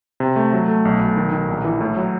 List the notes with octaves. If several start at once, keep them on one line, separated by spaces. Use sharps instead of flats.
C3
A3
F#3
A3
B1
B1
D#3
D#3
A#1
E3
A2
F#3